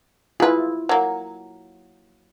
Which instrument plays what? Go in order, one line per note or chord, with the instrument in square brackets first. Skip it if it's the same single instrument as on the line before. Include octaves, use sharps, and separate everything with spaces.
[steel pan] E4 F4 [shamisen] G#4 B4
[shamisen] F#3 A#3